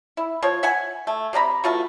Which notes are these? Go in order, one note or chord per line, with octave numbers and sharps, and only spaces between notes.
E4
F3 C#5
E5 F#5 G#5
A3
C3 D5 A#5 B5
E3 A3 F4 F#4